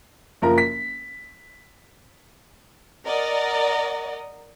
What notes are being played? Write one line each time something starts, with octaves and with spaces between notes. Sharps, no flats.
F#1 F3 A#4 A#5
B6
A#4 D5 D#5 F#5